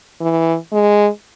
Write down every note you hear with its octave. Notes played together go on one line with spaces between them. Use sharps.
E3
G#3